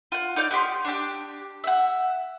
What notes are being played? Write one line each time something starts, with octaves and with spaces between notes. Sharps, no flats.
F4 F#5
D#4 D5 F5 G6
B3 G4 B5 C6
D4 G4
E5 F#5